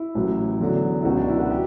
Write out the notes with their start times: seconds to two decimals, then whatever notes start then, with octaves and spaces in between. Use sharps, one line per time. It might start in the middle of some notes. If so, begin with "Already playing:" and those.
Already playing: E4
0.15 A1 A2 F#3
0.60 E2 D3 F#3
1.01 E4
1.05 C#2 B2 F#3 F#4
1.17 D4
1.28 E4
1.39 F#4
1.51 G4